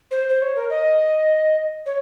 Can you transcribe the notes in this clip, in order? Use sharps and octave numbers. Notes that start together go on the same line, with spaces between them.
C5
C5
C#5
A#4
D#5
C#5